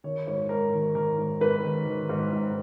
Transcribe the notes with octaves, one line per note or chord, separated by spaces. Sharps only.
D#3 C#5
G#2 C#5
G#2 A#4
D#3
D#3 A#4
G#2
G#2 B4
D#3
D#3
G#2
G#2